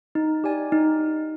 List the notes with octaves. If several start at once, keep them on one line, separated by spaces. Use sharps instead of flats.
D#4
G4 D5 G#5
D#4